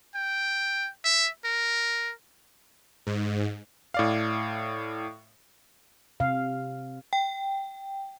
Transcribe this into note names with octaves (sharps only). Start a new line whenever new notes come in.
G5
E5
A#4
G#2
A2 D5 F5
C3 F5
G5